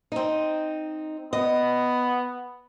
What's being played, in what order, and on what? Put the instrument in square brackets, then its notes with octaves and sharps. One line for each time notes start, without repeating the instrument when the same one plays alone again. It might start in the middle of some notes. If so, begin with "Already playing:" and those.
[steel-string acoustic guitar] C4 D#4
[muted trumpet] B3 [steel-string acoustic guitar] D#5